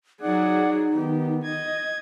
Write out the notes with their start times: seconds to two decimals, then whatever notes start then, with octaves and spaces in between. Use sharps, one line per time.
0.22 F#3 D#4 G#4 D5 F#5
0.94 D#3 B3 G4
1.43 D#5 G#6